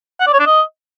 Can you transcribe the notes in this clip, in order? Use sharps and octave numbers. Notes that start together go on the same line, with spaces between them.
F#5
D5
C#5
D4
D#5